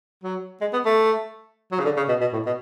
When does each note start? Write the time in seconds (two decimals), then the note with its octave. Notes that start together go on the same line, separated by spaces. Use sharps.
0.24 F#3
0.61 G#3
0.73 B3
0.85 A3
1.72 F#3
1.79 C#3
1.85 D3
1.97 C#3
2.08 B2
2.21 B2
2.33 A2
2.46 B2